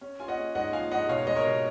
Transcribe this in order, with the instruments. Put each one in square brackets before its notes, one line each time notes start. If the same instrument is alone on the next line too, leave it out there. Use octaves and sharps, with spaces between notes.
[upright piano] C#4
[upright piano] F4 [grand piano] G#5
[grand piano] D#5 F#5
[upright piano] C#4
[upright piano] G#2 [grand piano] D#5 F#5
[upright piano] F3 [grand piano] F5 G#5
[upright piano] G#2 [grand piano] D#5 F#5
[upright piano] B2 [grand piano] C#5 F5
[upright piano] G#3 [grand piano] D#5
[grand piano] A#4 C#5
[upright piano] B2